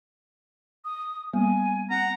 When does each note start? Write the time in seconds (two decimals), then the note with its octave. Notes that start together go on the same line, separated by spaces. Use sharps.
0.85 D#6
1.33 G3 A#3 B3 G#5
1.90 C4 F#5 A#5